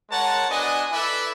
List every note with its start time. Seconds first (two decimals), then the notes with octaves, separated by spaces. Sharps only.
0.10 G#3 A#4 C#5 F#5 A5
0.49 B3 D4 F#4 D#5 G#5
0.92 E4 A4 B4 D5 E5